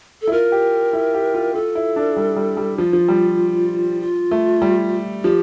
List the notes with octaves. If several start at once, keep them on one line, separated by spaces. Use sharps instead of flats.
A4
E4
F4 A#4
G4
E4
G4
F4
F4 A4
E4
D4
G3
G3
G3
F3 F4
F3
G3
F4
A3
G3
F3 G4